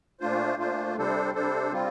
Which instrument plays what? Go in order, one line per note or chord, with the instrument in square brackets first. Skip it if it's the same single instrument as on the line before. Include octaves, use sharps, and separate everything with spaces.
[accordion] A#2 A3 D4 F4 C5
A#2 A3 D4 F4 C5
C3 G3 D4 A4 C5
C3 G3 D4 A4 C5
G3 C4 F4